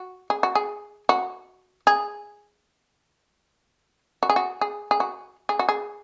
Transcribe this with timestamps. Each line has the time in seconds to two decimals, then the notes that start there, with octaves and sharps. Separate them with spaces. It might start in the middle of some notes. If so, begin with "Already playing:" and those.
Already playing: F#4
0.30 G#4
0.43 F#4
0.55 G#4
1.09 F#4
1.87 G#4
4.23 F#4
4.30 G#4
4.36 F#4
4.61 G#4
4.91 G#4
5.00 F#4
5.49 G#4
5.59 F#4
5.69 G#4